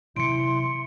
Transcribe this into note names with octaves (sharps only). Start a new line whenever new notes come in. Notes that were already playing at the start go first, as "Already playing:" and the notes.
C3 E3 F#3 E4 C6 C#7 D7